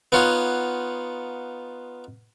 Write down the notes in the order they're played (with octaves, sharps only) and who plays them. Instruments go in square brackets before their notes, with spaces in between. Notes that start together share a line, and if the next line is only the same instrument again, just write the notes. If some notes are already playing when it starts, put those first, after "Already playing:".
[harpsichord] B3 D#4 F4 C#5 F#5